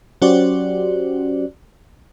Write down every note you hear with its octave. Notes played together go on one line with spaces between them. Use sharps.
F#3 C#4 F#4 G4 C5 D5